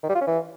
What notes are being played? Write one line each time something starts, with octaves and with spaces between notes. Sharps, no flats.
D#3
G3
F4
C#4
E3